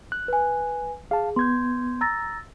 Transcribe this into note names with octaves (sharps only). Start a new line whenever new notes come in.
F#6
B4 G#5
G#4 F5 A5
B3 C6 G6 G#6
A#5 E6 A6 A#6